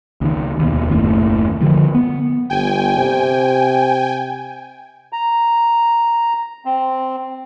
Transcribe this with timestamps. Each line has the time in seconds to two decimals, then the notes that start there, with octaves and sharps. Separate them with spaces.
0.21 C#2 D#3
0.59 D#2 B2
0.88 F#1 D#2 A2
1.61 G2 D3 F3
1.95 B3
2.50 G1 G5 G#5
2.97 C3
5.13 A#5
6.65 C4